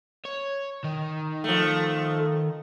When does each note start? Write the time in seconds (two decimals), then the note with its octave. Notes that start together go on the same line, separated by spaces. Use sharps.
0.25 C#5
0.84 D#3
1.44 F3 A3